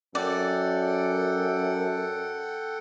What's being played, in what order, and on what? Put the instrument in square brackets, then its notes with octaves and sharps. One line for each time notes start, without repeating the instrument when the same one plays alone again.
[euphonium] F#2 [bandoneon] A4 F#5 G5 [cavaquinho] D5